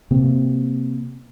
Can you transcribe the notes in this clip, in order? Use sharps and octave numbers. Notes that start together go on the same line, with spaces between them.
C3 A#3 C4